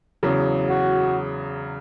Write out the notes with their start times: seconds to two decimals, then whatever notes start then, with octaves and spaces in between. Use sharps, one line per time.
0.23 E2 C#3 F#3
0.70 F#4